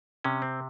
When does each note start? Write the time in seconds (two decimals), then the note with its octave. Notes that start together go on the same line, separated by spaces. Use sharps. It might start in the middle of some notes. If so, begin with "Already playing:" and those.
0.24 C3 C#4
0.42 C4